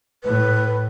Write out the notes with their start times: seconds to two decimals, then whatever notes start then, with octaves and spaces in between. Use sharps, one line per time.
0.24 A2 B4